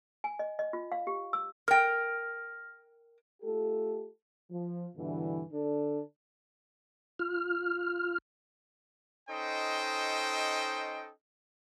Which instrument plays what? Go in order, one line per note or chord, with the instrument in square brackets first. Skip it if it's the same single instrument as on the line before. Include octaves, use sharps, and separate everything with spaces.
[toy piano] G#5
D#5
D#5
F4
F5
G4
E6
[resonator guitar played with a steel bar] A#4 G5 [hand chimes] F6 A#6
[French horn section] A3 F4 G4 A4
F3
G2 B2 D3 E3
D3 D4 A4
[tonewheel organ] F4 F6
[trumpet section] C#4 D#4 A4 C5 D#5 G5